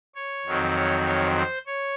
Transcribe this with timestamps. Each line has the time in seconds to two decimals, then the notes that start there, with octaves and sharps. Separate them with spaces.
0.15 C#5
0.46 F2 D#3 F#3 C4
0.76 C#5
1.06 C#5
1.37 C5
1.67 C#5